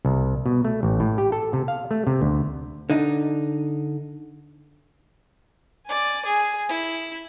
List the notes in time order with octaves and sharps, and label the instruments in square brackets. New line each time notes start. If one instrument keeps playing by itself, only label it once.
[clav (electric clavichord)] C2
B2
A3
A1
A2
G4
A4
C3
F5
A3
C3
D2
[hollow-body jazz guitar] D3 D#4
[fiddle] D5 G#5
G#4
E4